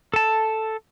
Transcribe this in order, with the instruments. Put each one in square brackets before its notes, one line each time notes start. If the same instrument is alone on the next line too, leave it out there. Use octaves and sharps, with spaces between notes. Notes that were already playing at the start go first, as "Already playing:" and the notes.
[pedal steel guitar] A4 A5